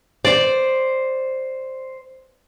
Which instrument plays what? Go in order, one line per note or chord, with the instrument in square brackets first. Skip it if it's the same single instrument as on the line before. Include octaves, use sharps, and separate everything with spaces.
[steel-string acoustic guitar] C5 [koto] D5